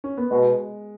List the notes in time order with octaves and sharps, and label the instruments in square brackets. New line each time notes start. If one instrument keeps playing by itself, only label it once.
[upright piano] C#4
B3
[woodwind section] B2 [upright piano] G#3